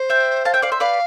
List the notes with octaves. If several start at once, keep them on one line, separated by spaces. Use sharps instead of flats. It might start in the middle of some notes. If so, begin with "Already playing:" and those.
Already playing: C5
E5 G5
F5 A5
E5 G5
D5 F5
C5 E5
B4 D5 F5